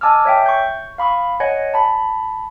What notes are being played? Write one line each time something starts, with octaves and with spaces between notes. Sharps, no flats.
D#5 G#5 A5 D6 E6 F6
C#5 E5 G5
C#6 G6
F5 B5 C#6 D#6
C#5 D#5 F#5 G#5
A5 B5